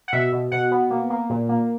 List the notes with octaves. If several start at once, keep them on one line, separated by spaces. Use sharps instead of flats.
F#5
B2 E5
B2
B2 F#5
B3
A#3
A#3
A#2
A#3